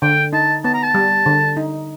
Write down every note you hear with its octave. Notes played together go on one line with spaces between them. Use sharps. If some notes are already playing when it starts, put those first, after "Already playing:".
D3 G5
D#4 A5
B3 A5
A#5
A5
G3
D3
D#4